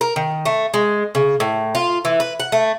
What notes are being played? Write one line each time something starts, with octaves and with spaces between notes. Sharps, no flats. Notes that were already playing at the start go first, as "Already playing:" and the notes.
A#4
D#3
A3
G#3
C#3
A2
F4
E3
B4
F#5
A3